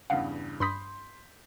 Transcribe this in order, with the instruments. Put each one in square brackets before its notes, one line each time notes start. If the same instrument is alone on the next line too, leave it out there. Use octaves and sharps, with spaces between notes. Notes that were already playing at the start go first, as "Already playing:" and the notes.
[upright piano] E2 G2 C#3 [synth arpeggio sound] F5 F#5
[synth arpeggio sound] G2 B5 D#6 [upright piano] C6 G6 B6